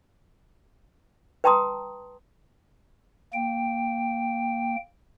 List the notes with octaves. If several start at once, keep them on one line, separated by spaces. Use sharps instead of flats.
B4 G5 A5 A#5 C6 D#6
A#3 G5